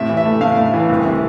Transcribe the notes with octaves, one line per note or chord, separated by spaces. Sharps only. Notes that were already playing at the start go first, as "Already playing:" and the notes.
Already playing: A2 C3 E5
E3
E5
A3
A2 F5
A2
E3
C2
C3